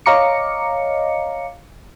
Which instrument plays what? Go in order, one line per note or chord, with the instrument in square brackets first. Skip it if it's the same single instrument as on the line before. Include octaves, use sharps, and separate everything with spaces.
[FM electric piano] C#5 D#5 F5 A#5 D6 C#7